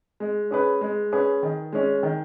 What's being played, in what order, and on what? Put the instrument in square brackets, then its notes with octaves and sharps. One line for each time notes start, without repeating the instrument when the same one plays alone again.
[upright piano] G#3
C#4 G#4 B4
G#3
C#4 G#4 B4
D#3
G#3 C#4
D#3